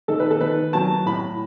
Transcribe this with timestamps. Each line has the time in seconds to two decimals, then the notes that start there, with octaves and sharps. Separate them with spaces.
0.08 D#3 A4
0.20 B4
0.30 A4
0.41 D#3 B4
0.73 F#3 A5
1.06 A2 B5